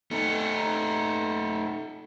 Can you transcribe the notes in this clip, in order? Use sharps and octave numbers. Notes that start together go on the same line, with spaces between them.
A3 D#4